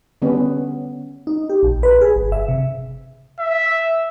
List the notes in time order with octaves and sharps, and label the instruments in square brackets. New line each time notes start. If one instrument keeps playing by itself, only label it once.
[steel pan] D3 G3 B3 C#4
[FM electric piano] D#4
G4
A#1
B4
G#4
G1
E5
C3
[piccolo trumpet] E5